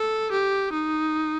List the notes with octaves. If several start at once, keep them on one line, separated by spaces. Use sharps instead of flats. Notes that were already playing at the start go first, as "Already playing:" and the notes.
Already playing: A4
G4
D#4